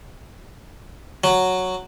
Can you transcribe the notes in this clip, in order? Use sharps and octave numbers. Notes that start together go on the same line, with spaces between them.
F#3